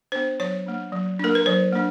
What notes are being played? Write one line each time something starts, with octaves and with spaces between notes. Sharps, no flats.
B3 D4 C5
F#3 C#5
A#3 D4
F#3
A#3 D4 A#4
B4
F#3 C5
A#3 D4